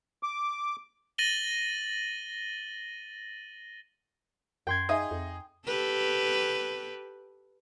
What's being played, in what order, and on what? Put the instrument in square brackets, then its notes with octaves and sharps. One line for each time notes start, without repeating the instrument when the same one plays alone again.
[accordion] D6
[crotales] A6 A#6 D#7 F#7 G7
[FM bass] F#2 [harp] G5 C6 G#6
[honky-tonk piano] D#4 G#4 [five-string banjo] E5 F5 [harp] D#6
[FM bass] F2
[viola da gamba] G4 A4 B4